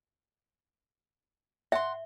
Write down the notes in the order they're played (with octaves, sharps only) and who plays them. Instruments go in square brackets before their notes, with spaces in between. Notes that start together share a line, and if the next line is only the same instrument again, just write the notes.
[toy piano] E5 [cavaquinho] F#5 C6